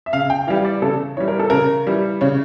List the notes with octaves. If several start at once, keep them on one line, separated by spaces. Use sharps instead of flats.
E5
C#3 F5
G5
E3 G3 F5
D5
C#3 A4
E3 G3 C#5
A#4
A4
C#3 A#4
E3 G3
C#3 C#5